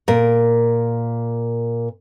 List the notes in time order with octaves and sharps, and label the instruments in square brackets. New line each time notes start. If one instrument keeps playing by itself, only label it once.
[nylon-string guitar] A#2 A#4